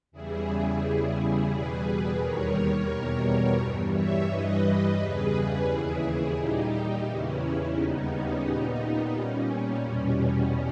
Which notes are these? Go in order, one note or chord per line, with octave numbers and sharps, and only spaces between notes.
E2 C#3 E3 G3 E4 G#4
E2 C#3 G3
E2 B2 G3 G#4 B4
D#2 D#3 G3 A#4 C#5
E2 B2 G3
G2 E3 G3
C#5 E5
G2 E3 G3 B4 D#5
E2 C#3 G3 G#4 B4
D#2 C#3 E3 E4 G#4
A#2 G3 D#4 G4
E2 C#3 E3 C#4 E4
D#2 C#3 G3 B3 D#4
C#4
A#2 G3 B3 D#4
A#2 G3 C#4
E2 B2 G3